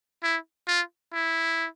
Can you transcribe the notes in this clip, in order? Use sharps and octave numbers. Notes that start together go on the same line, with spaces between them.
E4
F4
E4